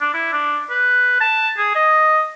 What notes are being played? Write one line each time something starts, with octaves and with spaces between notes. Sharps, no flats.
D4
E4
D4
B4
A5
G#4
D#5